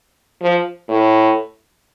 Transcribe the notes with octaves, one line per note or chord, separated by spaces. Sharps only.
F3
A2